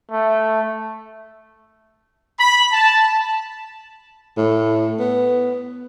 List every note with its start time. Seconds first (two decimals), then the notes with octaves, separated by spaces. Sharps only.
0.12 A3
2.39 B5
2.73 A5
4.37 A2
5.00 B3